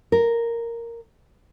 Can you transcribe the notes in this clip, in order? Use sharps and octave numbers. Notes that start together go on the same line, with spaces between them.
A#4